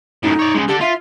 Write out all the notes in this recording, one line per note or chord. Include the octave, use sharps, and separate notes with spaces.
F#2 A2 D#4
C#5 D5
C#3 G#3
D3 D4 G4
F4 E5